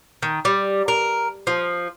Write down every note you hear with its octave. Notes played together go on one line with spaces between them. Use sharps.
D#3
G3
A#4
F3